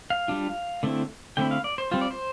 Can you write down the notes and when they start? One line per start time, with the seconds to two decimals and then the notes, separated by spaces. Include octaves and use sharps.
0.10 F5
0.28 G3 D4 F4
0.83 D3 A3 C4 E4
1.37 D3 A3 C4 E4 G5
1.51 F5
1.64 D5
1.78 C5
1.91 G3 C4 F4 C5
2.01 D5
2.11 C5